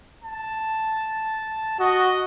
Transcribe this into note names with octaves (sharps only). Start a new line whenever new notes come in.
A5
F#4 D#5